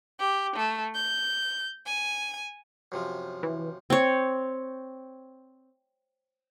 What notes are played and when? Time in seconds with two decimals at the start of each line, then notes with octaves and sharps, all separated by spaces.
0.19 G4
0.56 A3
0.95 G6
1.86 G#5
2.92 F#2 C3 F3
3.43 E3
3.90 C4 C#5